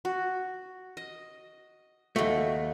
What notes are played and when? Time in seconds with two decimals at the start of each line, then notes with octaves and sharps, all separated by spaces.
0.05 F#4
0.97 D#5
2.16 D#2 A3 F#4